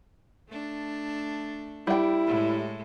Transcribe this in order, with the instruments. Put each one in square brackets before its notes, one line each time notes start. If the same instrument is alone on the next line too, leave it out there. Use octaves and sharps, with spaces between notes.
[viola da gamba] A3 D4
[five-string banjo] G3 G5 [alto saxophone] E4
[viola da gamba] A2 G#3